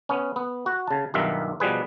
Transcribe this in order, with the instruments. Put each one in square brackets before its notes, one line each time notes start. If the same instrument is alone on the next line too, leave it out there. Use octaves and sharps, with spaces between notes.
[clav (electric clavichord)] B3 C#4
B3
F#4
C#3 A5
B1 G2 D#3 F4 E5
B2 F3 G3 G#4 B4